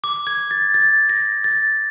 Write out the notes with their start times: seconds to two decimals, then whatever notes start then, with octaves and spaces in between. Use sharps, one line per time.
0.04 D6
0.27 G#6
0.51 A6
0.74 A6
1.09 A#6
1.44 A6